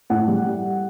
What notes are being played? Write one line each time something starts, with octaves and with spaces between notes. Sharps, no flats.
A2 F#5
G3